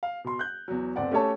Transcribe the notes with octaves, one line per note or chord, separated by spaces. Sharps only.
F5
B2 C6
F#6 G6
E2 F#3
G1 C4 D5 F#5
A3 C#4 G4 A4 C#5 A5